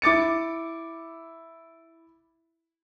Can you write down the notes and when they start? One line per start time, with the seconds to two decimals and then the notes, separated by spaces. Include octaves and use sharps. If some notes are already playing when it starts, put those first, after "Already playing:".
0.02 E4 D6 A6 C#7